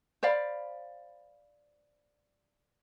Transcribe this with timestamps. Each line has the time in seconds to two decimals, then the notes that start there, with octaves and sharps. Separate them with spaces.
0.23 C5 D5 F5 B5